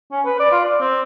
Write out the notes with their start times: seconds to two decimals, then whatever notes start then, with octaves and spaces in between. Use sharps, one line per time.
0.12 C#4
0.25 B4
0.39 D5
0.51 F4
0.64 D5
0.80 C4